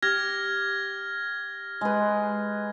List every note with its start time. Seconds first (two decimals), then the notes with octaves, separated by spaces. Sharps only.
0.02 G4 F6 G#6 A#6
1.81 G#3 B4